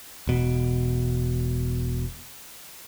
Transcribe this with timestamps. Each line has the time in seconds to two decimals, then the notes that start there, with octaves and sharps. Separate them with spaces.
0.27 E1 B2